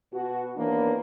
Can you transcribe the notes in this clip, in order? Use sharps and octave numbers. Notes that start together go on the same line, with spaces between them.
B2 F#4
D#2 E3 A#3 B3 D4